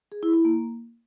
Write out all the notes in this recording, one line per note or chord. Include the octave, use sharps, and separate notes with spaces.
G#4
E4
E4
A#3